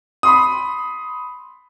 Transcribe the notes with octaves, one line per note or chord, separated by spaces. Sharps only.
B5 C6 D#6